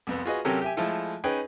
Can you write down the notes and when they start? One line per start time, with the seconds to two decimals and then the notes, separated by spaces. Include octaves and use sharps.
0.07 C2 F2 B3
0.25 F4 F#4 G#4 B4 D#5
0.45 C3 F#3 C#4 G4 A4 A#4
0.62 G4 E5 G#5
0.77 F3 G#3 A3 E4 F4 A4
1.24 C#4 D#4 G#4 B4 G5